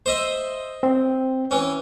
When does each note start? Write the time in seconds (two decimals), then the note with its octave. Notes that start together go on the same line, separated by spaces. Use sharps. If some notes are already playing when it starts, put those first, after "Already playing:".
0.06 C5 D#5 E5
0.83 C4
1.51 E3 C#4